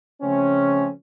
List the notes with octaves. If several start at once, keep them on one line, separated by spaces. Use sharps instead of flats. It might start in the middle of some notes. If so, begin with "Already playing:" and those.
C#3 F3 A3 C4 C#4